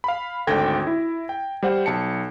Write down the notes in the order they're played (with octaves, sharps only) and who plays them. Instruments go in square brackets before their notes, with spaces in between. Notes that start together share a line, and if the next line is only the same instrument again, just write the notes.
[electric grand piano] F5 B5
G#1 D2 A4 G5 G#6 A#6
E4
G5
G3 C5 F#5
B1 A5 C#7